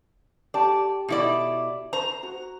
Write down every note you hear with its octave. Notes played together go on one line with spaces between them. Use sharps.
G4 D5 A5
B2 E4 D5
C5 A#5
F#4